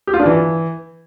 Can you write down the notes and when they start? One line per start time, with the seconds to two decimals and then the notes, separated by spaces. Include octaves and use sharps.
0.07 G4
0.14 F4
0.20 D4
0.26 E3